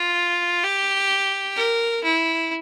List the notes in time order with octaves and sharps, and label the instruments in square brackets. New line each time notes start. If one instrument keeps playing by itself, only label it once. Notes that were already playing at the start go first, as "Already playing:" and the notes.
Already playing: [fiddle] F4
G4
A#4
E4